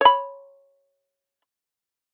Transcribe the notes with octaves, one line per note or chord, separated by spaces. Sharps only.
C#5 B5